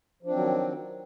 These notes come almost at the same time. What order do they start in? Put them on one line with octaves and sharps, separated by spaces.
F3 D4 C4 F#3 D#3